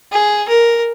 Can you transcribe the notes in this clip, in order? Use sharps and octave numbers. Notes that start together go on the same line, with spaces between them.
G#4
A#4